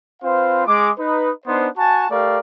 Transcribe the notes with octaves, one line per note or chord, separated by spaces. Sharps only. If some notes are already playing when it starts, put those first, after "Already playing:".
C4 F4 B4 C5 F5
G#3 D6
D#4 B4
B3 D4 D#4 C5
F#4 G#5 A5
A3 G4 A#4 D5 F5